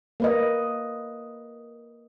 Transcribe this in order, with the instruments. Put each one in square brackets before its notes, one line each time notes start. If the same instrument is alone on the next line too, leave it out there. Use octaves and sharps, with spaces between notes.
[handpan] A#3 B4 D#5